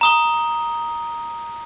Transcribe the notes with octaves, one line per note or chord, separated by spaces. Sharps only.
A#5 D#6 G7